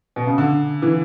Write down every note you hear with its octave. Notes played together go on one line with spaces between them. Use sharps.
B2
C#3
D3
E3